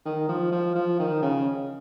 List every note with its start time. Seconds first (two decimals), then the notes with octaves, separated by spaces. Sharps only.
0.05 D#3
0.29 F3
0.52 F3
0.75 F3
0.99 D#3
1.22 C#3